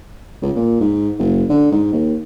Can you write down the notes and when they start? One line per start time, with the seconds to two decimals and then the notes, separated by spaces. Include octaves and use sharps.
0.42 C#2
0.55 A#2
0.80 G#2
1.19 F#1
1.49 D3
1.71 G#2
1.93 D#2